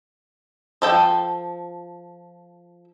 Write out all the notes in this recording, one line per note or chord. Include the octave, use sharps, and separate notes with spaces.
F3 A4 G5